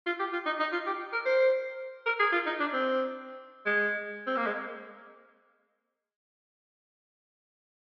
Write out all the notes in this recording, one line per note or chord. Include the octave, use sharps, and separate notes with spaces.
F4
G4
F4
D#4
D#4
F4
G4
A#4
C5
A#4
G#4
F4
D#4
D4
C4
G#3
C4
A#3
G#3